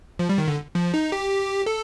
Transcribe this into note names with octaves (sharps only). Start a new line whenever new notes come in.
F3
G3
D#3
D3
F3
D#4
G4
A4